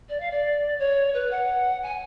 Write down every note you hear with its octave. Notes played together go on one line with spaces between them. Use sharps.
D5
F5
D5
C#5
B4
F#5
G#5